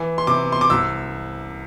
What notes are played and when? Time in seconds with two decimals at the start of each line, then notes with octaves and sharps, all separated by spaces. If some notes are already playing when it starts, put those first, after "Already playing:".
Already playing: E3
0.18 C6
0.27 C3 D6
0.52 C6
0.61 D6
0.70 C2 E6